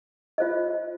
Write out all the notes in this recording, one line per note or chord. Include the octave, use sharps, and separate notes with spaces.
F4 C5 D#5